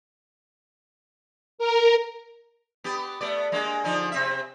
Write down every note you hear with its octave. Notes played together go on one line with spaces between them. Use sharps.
A#4
B3 G4
A3 B3 D5
G#3 A#3 D4
D3 F3 D#4
C3 C4 E5